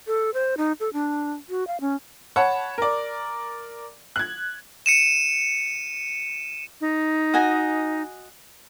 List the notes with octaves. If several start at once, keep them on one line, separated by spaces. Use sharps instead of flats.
A4
C5
D#4
A4
D4
F#4
F5
C#4
C#5 F#5 A5 B5
A#4 D5
F#6 G#6
C#7 D#7 E7
D#4
F#4 D#5 G#5